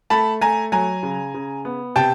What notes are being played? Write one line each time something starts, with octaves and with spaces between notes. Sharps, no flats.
A3 A5 B5
A3 G#5 A#5
F#3 G#5 A#5
C#3
C#3
B3
C3 G5 A5